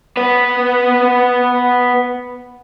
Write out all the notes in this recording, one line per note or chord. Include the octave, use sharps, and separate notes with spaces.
B3 B4